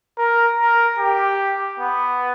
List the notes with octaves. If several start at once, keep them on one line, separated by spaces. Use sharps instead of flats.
A#4
A#4
G4
B3